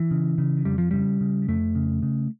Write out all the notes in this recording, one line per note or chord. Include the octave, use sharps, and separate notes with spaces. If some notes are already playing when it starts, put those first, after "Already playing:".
Already playing: E3
C#3
C#3
F2 G3
F3
C#3 G3
C#3
F2 A3
C#3
C#3